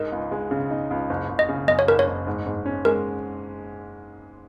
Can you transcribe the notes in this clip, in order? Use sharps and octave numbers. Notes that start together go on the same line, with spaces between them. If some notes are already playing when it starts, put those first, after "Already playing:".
Already playing: G#2 D#4 A#4
C#2
G#3
C#3
D#4
C#2
F#1
F#1
D#5
C#3
F#2 D#5
C#5
F#1 A#4
C#5
F#1
G#2
G#2
C#4
G#3 A#4